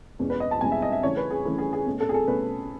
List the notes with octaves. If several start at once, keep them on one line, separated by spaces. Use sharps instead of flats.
E2 B2 G#3 C#4
B4
D#5
A5
E2 B2 G#3 C#4 G#5
E5
D#5
E5
C#3 E3 A3 C#4 C#5
B4
G#4
C#3 E3 A3 C#4
G#4
G#4
B2 A3 C#4
A4
G#4
A4
B2 A3 C#4 B4